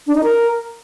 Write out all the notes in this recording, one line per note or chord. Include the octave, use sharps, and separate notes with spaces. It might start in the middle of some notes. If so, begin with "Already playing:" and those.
D4
D#4
A#4